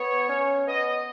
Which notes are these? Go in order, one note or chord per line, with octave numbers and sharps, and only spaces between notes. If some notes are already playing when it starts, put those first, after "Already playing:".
Already playing: B3 C#5
C#4
B3 D#5